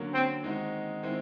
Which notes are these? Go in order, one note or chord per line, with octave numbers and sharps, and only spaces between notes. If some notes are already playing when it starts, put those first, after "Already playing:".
Already playing: D3 F#3 A#3 C#4
C4
D#3 G#3 C4 D#4 F#4
D#3 G#3 C4 E4